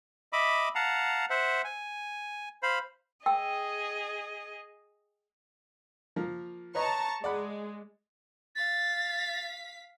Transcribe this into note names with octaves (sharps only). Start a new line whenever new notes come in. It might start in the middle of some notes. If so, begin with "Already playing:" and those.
D#5 E5 B5 D6
F5 F#5 A5 A#5
C5 E5 F#5
G#5
C5 F5 B5
G#4 D#5 G5 E6
F3 A#3 A#4
B4 C#5 D#5 A5 A#5 C#6
G#3 D5 F#5 B5
F5 A6 B6